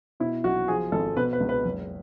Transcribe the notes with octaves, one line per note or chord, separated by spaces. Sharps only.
B2 E4
B1 F#4
F3 G#4
G#1 A4
B2 B4
B4
C#2
B4
F#1